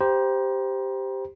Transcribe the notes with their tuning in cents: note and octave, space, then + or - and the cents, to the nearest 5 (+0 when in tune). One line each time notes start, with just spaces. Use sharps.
G4 +0 C5 -5 A#5 +35